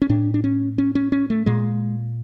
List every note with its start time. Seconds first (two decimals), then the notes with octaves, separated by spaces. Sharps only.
0.02 C#4
0.09 A2 D4
0.34 D4
0.44 C#4
0.78 C#4
0.95 C#4
1.12 C#4
1.30 A3
1.46 A#2 G#3